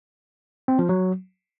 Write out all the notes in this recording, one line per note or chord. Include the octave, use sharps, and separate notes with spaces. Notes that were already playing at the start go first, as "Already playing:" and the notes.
C4
F3
F#3